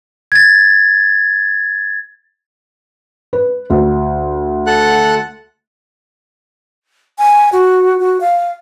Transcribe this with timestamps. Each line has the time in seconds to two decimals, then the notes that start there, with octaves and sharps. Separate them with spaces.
0.32 G#6 A6
3.33 B4
3.70 D2
4.67 A4 F#5 F#6
7.18 G#5
7.53 F#4
8.00 F#4
8.21 F5